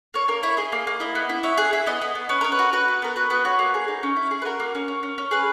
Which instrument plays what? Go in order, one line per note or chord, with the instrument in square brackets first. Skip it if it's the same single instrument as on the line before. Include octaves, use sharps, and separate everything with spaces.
[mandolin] A#3 C#5
A#3 A#4
E4 C#5
G#4 D#5
A#3
A#3
E4 D#5
B3
E4
C#4 E5
G#4 F#5
E4 E5
B3 D#5
B3
B3
C#4 B4
C#4 A#4
B4
F#4
F#4 B4
B3
B3 A#4
F#4 B4
B3 B4
F#4 C#5
A#3
G#4
D#4
C#4
E4
G#4
B4
F#4 A#4
A#3
C#4
C#4
C#4
C#4
G#4 B4